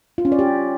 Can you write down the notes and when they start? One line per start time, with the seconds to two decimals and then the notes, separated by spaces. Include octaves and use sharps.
0.18 F4
0.25 C#4
0.32 D5
0.39 G4